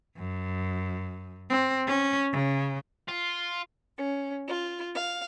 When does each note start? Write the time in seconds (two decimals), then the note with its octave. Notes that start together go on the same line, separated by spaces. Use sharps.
0.17 F#2
1.50 C4
1.87 C#4
2.32 C#3
3.09 F4
3.97 C#4
4.47 F4
4.94 F5